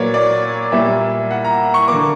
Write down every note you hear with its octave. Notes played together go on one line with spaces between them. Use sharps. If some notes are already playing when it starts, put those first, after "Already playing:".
Already playing: A#2 F#3 A#3 B4 C#5 D5
D5
A#2 G3 A#3 E5
F#5
A#5
C#6
D3 A#3 D6